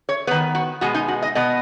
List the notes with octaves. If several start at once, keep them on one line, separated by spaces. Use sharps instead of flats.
C#5
D#3 B3 B4
F#4
B2 G#3 B3 F#4
D#4
F#4
D#5
B2 B3 D#5